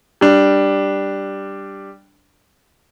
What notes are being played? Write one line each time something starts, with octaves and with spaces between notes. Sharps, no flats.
G3 D4